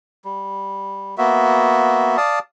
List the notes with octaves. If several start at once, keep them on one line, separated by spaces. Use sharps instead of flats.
G3
A#3 B3 F#4 E5
D5 F5 A5 D#6